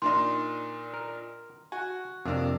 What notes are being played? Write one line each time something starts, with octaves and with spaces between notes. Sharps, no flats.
A#2 D4 D#4 C6
A#4
F#4 G#5
F2 C3 A#3 D4